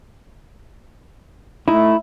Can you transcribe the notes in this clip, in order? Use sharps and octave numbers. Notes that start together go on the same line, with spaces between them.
A3 D#4 E4